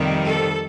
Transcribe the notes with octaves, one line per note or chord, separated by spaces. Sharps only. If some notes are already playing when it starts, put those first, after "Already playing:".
Already playing: F2 C3 D#3 G3
A4